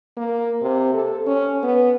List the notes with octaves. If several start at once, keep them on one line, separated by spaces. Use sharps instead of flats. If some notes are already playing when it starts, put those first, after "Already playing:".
A#3
C3
A4
C#4
B3